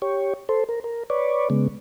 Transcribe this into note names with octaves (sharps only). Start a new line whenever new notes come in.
G4 C#5
A4 C5
A#4
A#4
B4 C#5 D5
C#3 G#3 B3